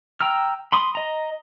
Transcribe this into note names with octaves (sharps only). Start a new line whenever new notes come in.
G5 A#5 E6 F6
B5 C6 D#6
D#5 A#5